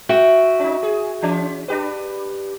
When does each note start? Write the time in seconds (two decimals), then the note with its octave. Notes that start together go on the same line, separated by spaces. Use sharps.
0.09 F#4 E5 G5
0.59 C#4 D#4
0.83 G#4
1.22 E3 C#4
1.68 D4 G4 B4